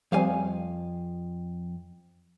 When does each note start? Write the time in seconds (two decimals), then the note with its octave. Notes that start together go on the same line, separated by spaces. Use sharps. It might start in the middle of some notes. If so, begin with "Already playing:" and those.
0.12 F2 F3 G3 C4 F5 G#5